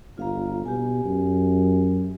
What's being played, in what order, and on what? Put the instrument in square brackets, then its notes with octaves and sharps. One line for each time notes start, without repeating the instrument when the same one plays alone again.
[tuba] G1 [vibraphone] F4 F5 A#5
[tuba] B2 [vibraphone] G4 G#5
[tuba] F#2